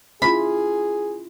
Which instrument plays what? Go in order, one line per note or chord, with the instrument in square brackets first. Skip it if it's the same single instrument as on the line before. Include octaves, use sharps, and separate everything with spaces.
[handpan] C#4 E4 F4 [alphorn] G#4 [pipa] B5